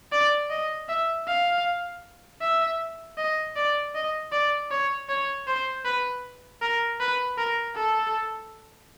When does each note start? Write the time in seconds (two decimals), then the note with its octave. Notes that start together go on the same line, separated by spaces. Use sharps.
0.12 D5
0.50 D#5
0.89 E5
1.27 F5
2.41 E5
3.17 D#5
3.56 D5
3.95 D#5
4.32 D5
4.71 C#5
5.09 C#5
5.47 C5
5.85 B4
6.62 A#4
7.00 B4
7.38 A#4
7.76 A4